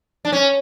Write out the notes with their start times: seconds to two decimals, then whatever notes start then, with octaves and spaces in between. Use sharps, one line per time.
0.25 D4
0.32 C#4